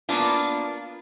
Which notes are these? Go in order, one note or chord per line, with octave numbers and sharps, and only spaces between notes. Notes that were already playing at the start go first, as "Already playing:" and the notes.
A#3 B3 D4 F4